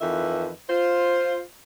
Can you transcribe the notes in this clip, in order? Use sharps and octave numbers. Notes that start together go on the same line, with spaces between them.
F2 D#3 E3 B4 E5
F4 C5